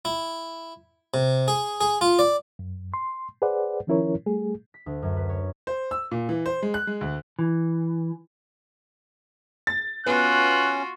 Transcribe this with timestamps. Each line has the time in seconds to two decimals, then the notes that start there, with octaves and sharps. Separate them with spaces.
0.05 E4
1.14 C3
1.48 G#4
1.81 G#4
2.01 F4
2.19 D5
2.59 F#2
2.94 C6
3.42 G#4 B4 C5 D5 F#5
3.87 D#3 F3 C#4 E4 A#4 C#5
4.26 G3 A3 G#4
4.74 B6
4.86 D2
5.02 F#2
5.17 B4
5.29 C#5
5.67 C5
5.91 E6
6.11 A#2
6.29 E3
6.46 C5
6.62 G#3
6.74 F#6
6.87 G#3
7.01 D2
7.39 E3
9.67 A6
10.06 B3 C#4 F4 F#4 F#6